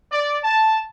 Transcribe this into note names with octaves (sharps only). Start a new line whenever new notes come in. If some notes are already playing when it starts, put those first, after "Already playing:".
D5
A5